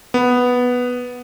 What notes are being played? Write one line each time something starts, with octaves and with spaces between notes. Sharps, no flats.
B3